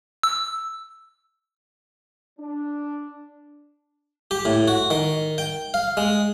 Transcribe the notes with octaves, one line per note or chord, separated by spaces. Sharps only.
E6
D4
G4
A2
F#4
D#3
G5
F5
G#3